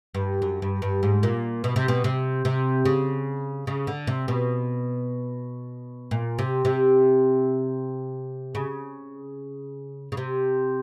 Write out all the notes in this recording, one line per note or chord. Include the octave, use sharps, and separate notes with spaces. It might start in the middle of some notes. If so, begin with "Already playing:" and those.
G2
F#2
G2
G2
G#2
A#2
B2
C3
B2
C3
C3
C#3
C#3
D3
C3
B2
A#2
C3
C3
C#3
C#3
C3